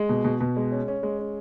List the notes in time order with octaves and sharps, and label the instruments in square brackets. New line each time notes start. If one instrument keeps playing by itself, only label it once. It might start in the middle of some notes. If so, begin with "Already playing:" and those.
Already playing: [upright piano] G#3
B2
B2
B2
G#3
C#4
C#4
G#3
C#4